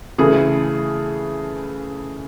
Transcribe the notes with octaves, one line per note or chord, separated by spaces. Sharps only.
C#3 E3 A3 G#4